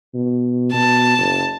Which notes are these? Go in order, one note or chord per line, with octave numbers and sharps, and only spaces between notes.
B2
B2 A5
F#1